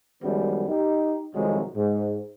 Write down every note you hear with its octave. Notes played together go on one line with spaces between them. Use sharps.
F#2 D#3 F3 G3 G#3 B3
D#4 G4
C2 F2 D#3 F3 F#3 G#3
G#2